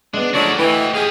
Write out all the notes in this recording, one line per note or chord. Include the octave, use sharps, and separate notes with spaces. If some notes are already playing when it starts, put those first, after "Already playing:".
G#3 B3 D4
D3 F3 F#3 G#3 A3 D4 F#4 D5
E3 D#5 G5
G4 G#4 F5